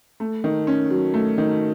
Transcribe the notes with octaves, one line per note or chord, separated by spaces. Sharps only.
A3
D#3
C#4
F#3
A3
D#3